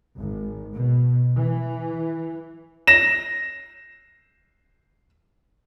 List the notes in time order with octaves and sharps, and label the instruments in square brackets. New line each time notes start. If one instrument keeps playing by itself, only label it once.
[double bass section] G#1
B2
E3
[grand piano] A#6 E7